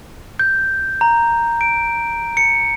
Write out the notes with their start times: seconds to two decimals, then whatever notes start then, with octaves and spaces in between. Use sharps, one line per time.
0.39 G6
1.01 A#5
1.61 D7
2.37 C#7